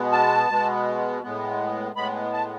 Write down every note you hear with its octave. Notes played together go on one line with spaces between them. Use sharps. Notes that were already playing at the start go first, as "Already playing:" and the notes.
Already playing: B2 G#3 B3
A5
B2 G#3 B3
A2 G#3 B3
A2 G#3 B3 B5
A5